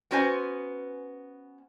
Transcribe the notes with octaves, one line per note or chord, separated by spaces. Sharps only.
B3 C#4 F#4 B4 C5 G#5